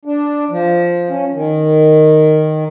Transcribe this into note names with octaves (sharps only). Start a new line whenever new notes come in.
D4
F3
C#4
D#3